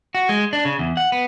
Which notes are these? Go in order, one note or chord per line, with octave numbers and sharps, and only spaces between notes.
F#4
G#3
D4
C#3
E2
F#5
B3